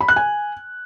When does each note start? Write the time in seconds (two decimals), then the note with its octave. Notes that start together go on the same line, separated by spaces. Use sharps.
0.01 B5
0.08 F#6
0.16 G#5